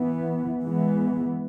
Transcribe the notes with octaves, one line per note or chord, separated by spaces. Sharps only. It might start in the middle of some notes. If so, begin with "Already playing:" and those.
Already playing: E3 B3
E3 G#3 B3